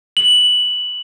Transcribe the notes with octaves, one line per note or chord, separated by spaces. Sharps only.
F#7